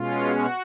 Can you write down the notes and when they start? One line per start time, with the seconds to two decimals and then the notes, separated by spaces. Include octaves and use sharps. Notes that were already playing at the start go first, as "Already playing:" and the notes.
Already playing: B2 G#3 C#4 F4
0.30 F#4